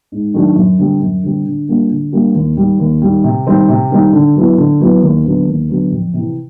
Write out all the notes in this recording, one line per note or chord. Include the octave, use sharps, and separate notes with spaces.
G#2
D#3 F#3 A3 D4
F#2
D3 G3 C4
F#2
D3 G3 C4
D3
G3 A#3 D4 F4
D3
G3 A#3 D4 F4
D#2
D#3 G3
D#2
D#3 G3
C3
D#3 G3 C4 D#4
C3
D#3 G3 C4 D#4
D3
F#3 B3 E4
D3
F#3 B3 E4
D#2
D3 F#3 B3
D#2
D3 F#3 B3
F2
C3 E3